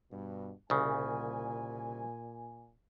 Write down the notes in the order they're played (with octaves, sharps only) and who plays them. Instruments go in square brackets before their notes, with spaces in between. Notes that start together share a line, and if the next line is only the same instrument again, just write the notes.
[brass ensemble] G2 B2
[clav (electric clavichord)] C2 C#3 [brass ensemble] A#2 G#5